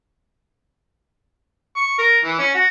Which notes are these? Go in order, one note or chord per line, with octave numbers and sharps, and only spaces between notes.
C#6
A#4
E3
C#4
F#4